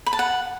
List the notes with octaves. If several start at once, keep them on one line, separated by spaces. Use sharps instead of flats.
B5
A5
F#5